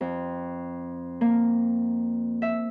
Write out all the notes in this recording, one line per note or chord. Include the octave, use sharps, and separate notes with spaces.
F2
A#3
E5